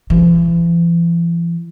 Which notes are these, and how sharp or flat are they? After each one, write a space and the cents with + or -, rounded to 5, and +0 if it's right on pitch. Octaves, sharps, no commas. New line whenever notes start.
E3 +45